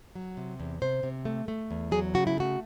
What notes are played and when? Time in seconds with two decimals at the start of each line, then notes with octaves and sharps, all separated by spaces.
0.15 F#3
0.37 C3
0.60 E2
0.82 C3 C5
1.03 C3
1.25 A3
1.48 A3
1.71 E2
1.92 F#3 G#4
2.14 C#3 F#4
2.27 E4
2.37 A3 F#4